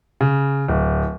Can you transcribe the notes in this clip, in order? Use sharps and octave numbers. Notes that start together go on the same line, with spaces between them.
C#3
D1